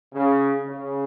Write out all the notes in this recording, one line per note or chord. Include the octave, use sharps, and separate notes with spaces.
C#3
C#3